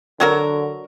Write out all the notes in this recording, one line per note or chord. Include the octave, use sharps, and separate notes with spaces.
D3 F#3 F#4 A#4